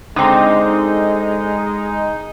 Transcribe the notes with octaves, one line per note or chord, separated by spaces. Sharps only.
D3 G#3 C4 D#4